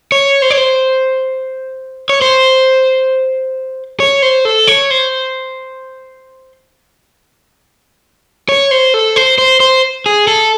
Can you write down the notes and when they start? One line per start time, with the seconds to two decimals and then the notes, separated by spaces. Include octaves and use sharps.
0.12 C#5
0.42 C5
0.51 C#5
0.58 C5
2.09 C#5
2.22 C5
4.00 C#5
4.22 C5
4.45 A4
4.67 C#5
4.91 C5
8.49 C#5
8.71 C5
8.94 A4
9.16 C5
9.38 C5
9.60 C5
10.06 G#4
10.27 A4